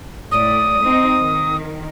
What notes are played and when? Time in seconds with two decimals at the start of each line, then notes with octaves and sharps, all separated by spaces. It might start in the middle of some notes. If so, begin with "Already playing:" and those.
0.31 A2 D5 D#6
0.83 C4 D#4
1.19 D#3